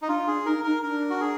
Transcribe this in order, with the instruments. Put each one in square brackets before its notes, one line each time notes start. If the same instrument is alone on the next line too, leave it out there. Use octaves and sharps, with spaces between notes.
[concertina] D#4
[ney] D4 [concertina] F4
[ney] D4 [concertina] G#4
[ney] D#4 [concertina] A#4
[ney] D#4 [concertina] A#4
[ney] D4 [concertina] A#4
[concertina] F#4
G#4